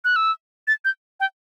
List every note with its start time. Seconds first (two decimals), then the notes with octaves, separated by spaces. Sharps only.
0.05 F#6
0.16 E6
0.68 A6
0.85 G6
1.20 G5